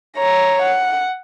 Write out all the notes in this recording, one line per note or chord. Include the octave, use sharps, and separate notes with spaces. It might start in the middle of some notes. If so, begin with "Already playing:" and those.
C#5 A#5
F#5